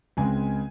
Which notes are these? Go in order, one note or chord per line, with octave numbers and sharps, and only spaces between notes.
C#2 C#3 G#3 C4 G#5